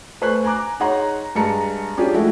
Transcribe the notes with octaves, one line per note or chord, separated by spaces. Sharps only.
A3 B4 C5 G#5 C#6 F#6
G#5 A#5 D6 F#6
D#4 G#4 C#5 F#5 A#5 C6
G2 G#3 G#4 A5 A#5 C#7
C#4 D4 F4 G4 G#4
F3 G#3 A3 E4 F#4